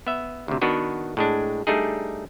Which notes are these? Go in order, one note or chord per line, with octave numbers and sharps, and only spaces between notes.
B3 E5
D2 C3
D#3 B3 D4 F#4 B4
A2 G#3 D4
G3 A3 D4 D#4 G#4